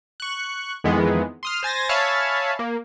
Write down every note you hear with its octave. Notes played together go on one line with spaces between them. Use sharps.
C#6 F#6
F2 D#3 E3 G#3 B3
C6 D#6 F6
C5 G#5 A6 A#6
C#5 E5 F5 G#5 A5 B5
A#3